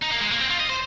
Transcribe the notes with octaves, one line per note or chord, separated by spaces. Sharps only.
D#4
A#3
G#3
A#3
C4
F4
D#5
C5